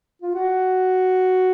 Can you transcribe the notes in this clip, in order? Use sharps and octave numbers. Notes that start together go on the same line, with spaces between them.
F4
F#4